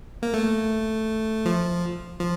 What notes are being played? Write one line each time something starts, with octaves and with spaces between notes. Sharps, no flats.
A#3
A3
F3
F3